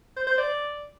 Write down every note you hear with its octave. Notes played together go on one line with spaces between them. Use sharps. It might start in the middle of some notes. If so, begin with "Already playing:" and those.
C5
C5
D5